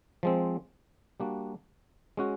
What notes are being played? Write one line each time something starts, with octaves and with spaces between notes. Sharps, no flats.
F3 G#3 C4
G3 A#3 D4 F#4
G#3 C#4 F#4